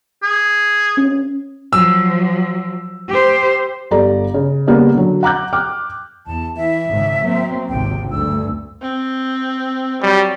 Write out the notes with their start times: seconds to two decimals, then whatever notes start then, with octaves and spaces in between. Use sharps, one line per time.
0.23 G#4
0.98 C#4
1.73 F3 F#3 E6
3.09 G4 C5
3.91 G1 G4 A4 D5 A#5
4.34 C#3
4.67 C#3 G3 A#3 B3
4.95 D3 F#3
5.23 F#5 A#5 D6 F#6 G6
5.53 G5 D6 F6
6.27 E2 A5
6.57 E3 E5
6.88 G#1 G#2 C#3
7.23 F#3 A#3 C4
7.69 G#1 C#2 C3 G5
8.11 D2 G2 E6
8.82 C4
10.03 F#3 G3